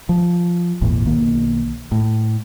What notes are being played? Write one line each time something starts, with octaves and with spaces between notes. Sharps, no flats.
F3
G#1 E2 A#2
B1 D#3 A#3
A2